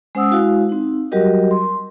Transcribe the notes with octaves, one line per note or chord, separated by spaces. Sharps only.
G#3 C#4 C5 F#5 D#6 E6
G#3 E4 F#4 F5
C4 D#4
F#3 G3 F#4 G4 A#4 D#5
C6